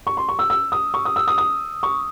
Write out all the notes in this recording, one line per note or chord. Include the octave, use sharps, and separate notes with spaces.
C#6
C6
C#6
E6
E6
D#6
C#6
D#6
E6
D#6
D#6
C#6